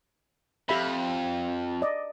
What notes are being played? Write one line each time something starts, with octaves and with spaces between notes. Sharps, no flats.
F2 G4 E5 B5
D5 D#5